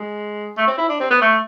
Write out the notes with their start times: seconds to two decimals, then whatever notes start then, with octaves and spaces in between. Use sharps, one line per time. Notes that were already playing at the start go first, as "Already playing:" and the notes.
Already playing: G#3
0.57 A3
0.67 C4
0.78 E4
0.89 D4
1.00 C4
1.10 B3
1.21 A3